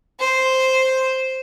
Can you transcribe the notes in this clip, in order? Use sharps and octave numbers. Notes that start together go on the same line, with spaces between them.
C5